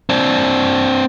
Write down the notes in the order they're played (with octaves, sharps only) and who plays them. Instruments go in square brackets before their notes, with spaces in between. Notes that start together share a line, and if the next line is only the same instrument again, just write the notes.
[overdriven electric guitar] C4 D4